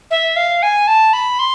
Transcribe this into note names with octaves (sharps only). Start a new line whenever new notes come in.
E5
F5
G#5
A5
B5
C6